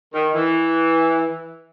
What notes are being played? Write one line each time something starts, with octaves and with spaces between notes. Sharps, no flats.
D#3
E3